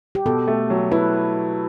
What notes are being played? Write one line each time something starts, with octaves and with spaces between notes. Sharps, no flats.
G4
B2 A4
A3
F#3
E4 B4